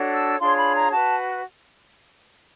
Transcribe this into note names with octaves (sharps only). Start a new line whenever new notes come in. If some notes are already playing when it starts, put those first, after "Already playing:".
Already playing: D4 F#4 A4 C#5
E6
D4 F4 G#4 C#5 C6
B5
A#5
F#4 B4 A5